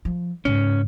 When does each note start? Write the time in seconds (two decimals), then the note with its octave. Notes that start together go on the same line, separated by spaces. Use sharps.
0.05 F3
0.45 G#2 C#3 C#4